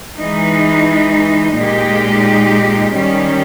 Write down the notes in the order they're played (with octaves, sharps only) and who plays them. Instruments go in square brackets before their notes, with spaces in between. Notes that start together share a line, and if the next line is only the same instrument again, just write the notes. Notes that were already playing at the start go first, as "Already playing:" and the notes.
[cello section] E3 G#3 D#4
A#2 G#3 D#4 G4
D#3 G3 C#4 G4